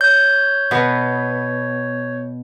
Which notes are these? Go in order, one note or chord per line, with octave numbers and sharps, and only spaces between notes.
C#5 G6
B2 B3